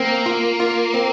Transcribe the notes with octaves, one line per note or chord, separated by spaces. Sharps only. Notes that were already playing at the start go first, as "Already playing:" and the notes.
Already playing: A#3 C4
F4
F4
C4